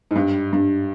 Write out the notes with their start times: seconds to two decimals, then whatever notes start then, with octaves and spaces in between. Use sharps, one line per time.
0.11 G#2
0.16 G2
0.53 G2